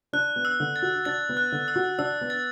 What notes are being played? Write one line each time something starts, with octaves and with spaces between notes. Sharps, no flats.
D4 F#6
B3
E6
D3
A6
F#4
D4 A6
B3
F#6
D3
E6
F#4
D4 E6
B3
A6